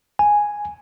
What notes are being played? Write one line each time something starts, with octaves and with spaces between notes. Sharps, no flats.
G#5